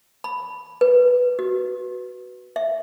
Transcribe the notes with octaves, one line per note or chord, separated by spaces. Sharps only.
B5
B4
F#4
E5